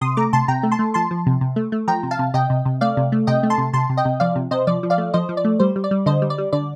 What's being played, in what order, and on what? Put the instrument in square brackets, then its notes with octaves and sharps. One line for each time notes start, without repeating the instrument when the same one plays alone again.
[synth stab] C3 C6 D#6
A3 A#5 D6
C3 A5 C6
C3 G5 A#5
A3
A5 C6
A3
F3 A5 C6
F3
C3
C3
A3
A3
F3 G5 A#5
C3
F5 A5
C3
C3 D#5 G5
C3
C3
A3 D5 F5
C3
A3
C3 D#5 G5
A3
A5 C6
C3
C3 A5 C6
C3
D#5 G5
C3
F3 D5 F5
C3
C3 C5 D#5
F3 D5
F3
D5 F5
A3
F3 C5 D#5
F3
D5
A3
G3 C5
G3
D5
G3
D3 C5 D#5
G3
D5
G3
D3 D5